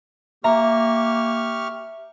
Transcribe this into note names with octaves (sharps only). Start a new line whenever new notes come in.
A#3 G4 E5 A#5 C#6 F6